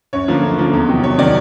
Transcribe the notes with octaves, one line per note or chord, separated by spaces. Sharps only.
F#2 C#5
D3 F3 A#3
F#2
D3 F3 A#3
E2
C3 D#3 F#3
E2 C#5
C3 D#3 F#3 D5